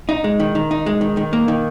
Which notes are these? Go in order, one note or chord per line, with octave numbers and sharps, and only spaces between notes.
D#4
G#3
D#3
D#3
D#4
G#3
D#3
D#3
A#3
D#3